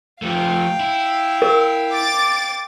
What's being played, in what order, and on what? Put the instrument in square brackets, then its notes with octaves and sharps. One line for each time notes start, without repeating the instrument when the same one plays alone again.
[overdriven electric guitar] F3 A3 [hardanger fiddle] F5 G5
[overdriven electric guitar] E4
[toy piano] A#4
[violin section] D6 A6